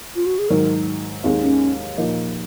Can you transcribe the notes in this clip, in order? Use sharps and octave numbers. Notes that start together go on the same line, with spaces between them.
F4
F#4
G#4
G#2 D#3 F#3 A#4
D#2 D#3 G#3 C4
C#4
A#2 F3 A#3 D#4